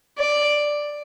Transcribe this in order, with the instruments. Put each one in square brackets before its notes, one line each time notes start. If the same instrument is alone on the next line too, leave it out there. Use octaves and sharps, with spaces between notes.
[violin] D5